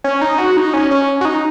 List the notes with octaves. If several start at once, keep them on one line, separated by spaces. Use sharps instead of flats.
C#4
D#4
F#4
D#4
C#4
C#4
F#4
D#4